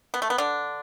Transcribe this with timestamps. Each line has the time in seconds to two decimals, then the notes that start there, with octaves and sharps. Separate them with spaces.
0.14 B3
0.22 A3
0.30 B3
0.38 D3 D4